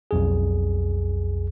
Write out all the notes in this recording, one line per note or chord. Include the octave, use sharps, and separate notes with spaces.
B1 F2 G#4